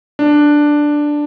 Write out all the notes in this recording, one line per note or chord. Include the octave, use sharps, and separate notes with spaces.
D4